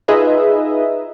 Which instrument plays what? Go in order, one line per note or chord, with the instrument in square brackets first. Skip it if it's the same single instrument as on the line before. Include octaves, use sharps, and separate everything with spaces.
[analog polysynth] D#4 F4 G#4 B4 D#5 E5